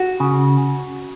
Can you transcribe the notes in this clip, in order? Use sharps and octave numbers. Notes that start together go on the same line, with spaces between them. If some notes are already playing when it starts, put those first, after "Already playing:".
Already playing: F#4
C#3